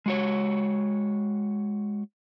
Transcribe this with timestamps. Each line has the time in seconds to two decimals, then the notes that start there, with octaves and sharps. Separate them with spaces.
0.06 G#3 F#4 C#5